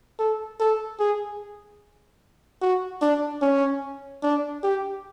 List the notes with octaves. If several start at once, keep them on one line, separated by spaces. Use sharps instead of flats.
A4
A4
G#4
F#4
D4
C#4
D4
G4